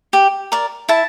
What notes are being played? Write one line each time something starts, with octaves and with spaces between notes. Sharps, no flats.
G4
A#4 D5
E4 A5